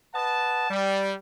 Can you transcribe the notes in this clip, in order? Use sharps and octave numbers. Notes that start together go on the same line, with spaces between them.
B4 D#5 F#5 A5
G3